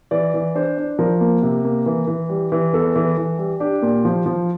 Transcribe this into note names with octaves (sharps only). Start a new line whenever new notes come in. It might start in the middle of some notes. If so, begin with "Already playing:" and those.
E3 D5
E3
D4 C5
D4
F3 A#4
A#3
C3
A#3
E3
E3
G3
E3
E2 A4
E3
E3
G3
D4 G4
A#2
F3
F3